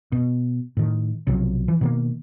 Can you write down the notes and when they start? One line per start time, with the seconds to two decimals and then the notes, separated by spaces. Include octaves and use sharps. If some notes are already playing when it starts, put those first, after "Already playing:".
0.12 B2
0.77 A2 D#3
1.27 B1 C3 F3 F#3
1.68 E3
1.81 B2 D#3 A#3